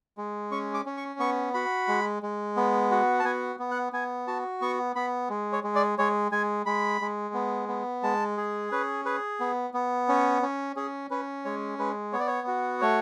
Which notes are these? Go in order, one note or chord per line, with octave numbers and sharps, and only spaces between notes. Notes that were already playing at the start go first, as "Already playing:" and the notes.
G#3
C#4 C#6
D6
C#4
C#6
B3 C#6
F#4 B5
G#3
G#3
B3
F#4
A5
B3 G#5
B3
F#5
B3 G#5
F#4 A5
B3 C#6
B3 B5
G#3
C#5
G#3
D5
G#3 C#5
G#3 G#5
G#3 B5
G#3
B3
B3
G#3 A5
G#4
C#4 B4
G#4 B4
B3
B3
C#4
C#4
C#4 G#4
C#4 B4
G#3 C#5
G#3 B4
B3 C#5
D5
C#5
F#4
A3 C#5